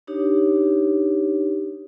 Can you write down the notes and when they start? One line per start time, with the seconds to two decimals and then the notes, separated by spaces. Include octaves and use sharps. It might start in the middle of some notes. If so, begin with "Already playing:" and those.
0.07 D4 D#4 G4 C#5